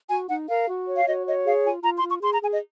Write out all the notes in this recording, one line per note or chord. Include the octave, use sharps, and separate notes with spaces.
F#4 G#5
D#4 F#5
A#4 F5
F#4
C#5
F5
F#4 D#5
C#5 D#5
G#4 F5
F4 G#5
F4 A#5
C6
F4
C#6
G#4 C6
A#5
G#4 G#5
D#5